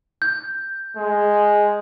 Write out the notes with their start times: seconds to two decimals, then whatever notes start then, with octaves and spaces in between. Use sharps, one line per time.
0.22 G6
0.96 G#3